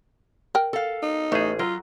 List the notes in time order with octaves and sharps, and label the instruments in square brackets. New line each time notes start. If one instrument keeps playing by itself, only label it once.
[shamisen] A#4 G5
[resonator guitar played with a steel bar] A4 F5
[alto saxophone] D#4
[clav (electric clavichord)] A1 G#4 [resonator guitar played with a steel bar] A3
[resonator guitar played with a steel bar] F#3 [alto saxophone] F4